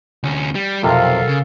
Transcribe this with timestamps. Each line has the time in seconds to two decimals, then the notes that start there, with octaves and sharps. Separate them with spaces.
0.24 D2 C#4
0.55 G3
0.83 B1 F2 C3 A4 A#4 F5
1.28 C#3